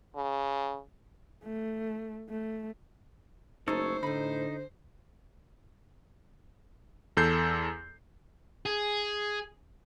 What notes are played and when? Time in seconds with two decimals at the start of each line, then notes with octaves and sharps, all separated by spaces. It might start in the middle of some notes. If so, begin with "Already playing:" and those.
0.16 C#3
1.43 A3
2.30 A3
3.68 F#1 A3 D#4 A4 C5 C#5
4.03 A2 D3 D#4 B5
7.17 E2 A4 G6 C7
8.66 G#4